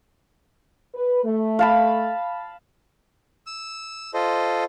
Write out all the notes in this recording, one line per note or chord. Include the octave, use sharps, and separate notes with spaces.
B4
A3
F5 A5 B5
E6
F4 A4 C5 D#5